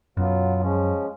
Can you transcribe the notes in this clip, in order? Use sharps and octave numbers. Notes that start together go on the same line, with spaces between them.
F#2 B2 F#3 B3 F4
F3 G#3 C#4